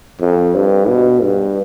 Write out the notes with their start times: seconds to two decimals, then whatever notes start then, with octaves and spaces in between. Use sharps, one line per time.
0.20 F2
0.55 G2
0.89 B2
1.24 G2